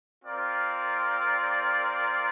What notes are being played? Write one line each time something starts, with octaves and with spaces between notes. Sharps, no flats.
C4 F4 A#4 D5